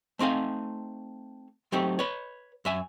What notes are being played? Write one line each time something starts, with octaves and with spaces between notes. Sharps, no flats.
A3 C4 D#4 F5 G#5
F#3 A3 C4 D#4 G4
B4 C#5
F#2 E5 G#5